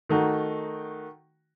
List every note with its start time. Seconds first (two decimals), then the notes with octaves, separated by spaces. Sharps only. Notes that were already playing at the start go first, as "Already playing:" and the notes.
0.09 D#3 A3 D#4 F#4